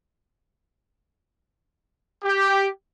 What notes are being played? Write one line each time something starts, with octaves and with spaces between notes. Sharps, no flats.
G4